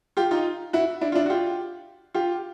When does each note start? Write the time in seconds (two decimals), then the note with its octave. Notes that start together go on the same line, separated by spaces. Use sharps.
0.17 F4 G4
0.31 D#4 F4
0.73 E4 F#4
1.01 D4 E4
1.12 F4
1.15 D4 E4
1.26 F#4
1.30 F4 G4
2.15 F4 G4